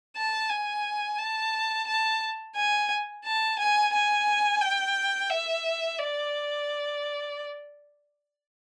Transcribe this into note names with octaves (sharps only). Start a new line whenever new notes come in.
A5
G#5
A5
A5
G#5
A5
G#5
G#5
G5
E5
D5